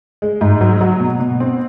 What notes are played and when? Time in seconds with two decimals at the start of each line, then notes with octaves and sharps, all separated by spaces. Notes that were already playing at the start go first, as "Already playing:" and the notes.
0.22 G#3
0.41 G#2
0.61 F#3
0.81 F#3
1.00 B2
1.20 B2
1.40 C4